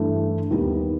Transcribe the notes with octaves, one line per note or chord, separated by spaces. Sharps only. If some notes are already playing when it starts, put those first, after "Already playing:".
Already playing: G2 E3 A3
D#2 D#3 G3 B3